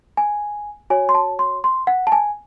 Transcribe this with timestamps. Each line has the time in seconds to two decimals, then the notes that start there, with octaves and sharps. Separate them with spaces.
0.17 G#5
0.90 F#4 C#5 G#5
1.09 C6
1.15 A5
1.39 C6
1.64 C6
1.87 F#5
2.07 A5
2.12 G#5